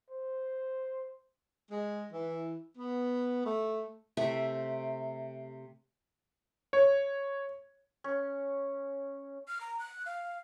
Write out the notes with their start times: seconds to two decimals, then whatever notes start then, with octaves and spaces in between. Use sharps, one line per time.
0.10 C5
1.71 G#3
2.12 E3
2.78 B3
3.46 A3
4.17 C3 A3 E5
6.73 C#5
8.04 C#4
9.47 F6
9.61 A#5
9.79 F#6
10.06 F5